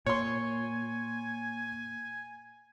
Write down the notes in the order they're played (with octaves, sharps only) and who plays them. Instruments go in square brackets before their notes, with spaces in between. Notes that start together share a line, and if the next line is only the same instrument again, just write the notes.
[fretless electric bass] A#2 [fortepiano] C#5 C6 [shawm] G#5